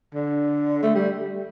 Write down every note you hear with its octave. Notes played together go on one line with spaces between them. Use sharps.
D3
A3
G3